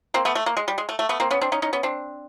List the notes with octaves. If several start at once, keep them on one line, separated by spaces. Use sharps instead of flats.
A#3 C4
A3 B3
A3
A#3
G#3
G3
G#3
A3
A3
A3 B3
A#3 C4
B3 C#4
C4 D4
C#4 D#4
C#4 D#4
B3 C#4
C4 D4